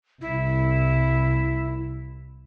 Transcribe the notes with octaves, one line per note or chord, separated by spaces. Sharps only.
C2 E4